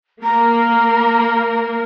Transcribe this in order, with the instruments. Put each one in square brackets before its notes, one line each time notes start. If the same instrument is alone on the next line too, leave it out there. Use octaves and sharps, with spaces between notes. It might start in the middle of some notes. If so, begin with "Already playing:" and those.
[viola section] A#3 A#4 [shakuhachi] A#5